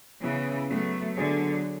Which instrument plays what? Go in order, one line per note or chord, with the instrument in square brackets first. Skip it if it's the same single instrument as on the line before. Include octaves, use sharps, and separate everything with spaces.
[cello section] C#3 E3 [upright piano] B3
[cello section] F#3 A3 [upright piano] B3
[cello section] D3 F#3 [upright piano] G#4